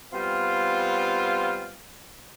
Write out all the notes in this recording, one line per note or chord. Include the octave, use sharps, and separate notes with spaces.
G3 B3 C4 F4